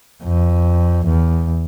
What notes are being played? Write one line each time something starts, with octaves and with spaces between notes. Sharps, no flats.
F2
E2